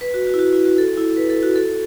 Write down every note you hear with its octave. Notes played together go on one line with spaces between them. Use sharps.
B4
F#4
F#4
E4
F#4
E4
F#4
A4
E4
B4
A4
F#4
A4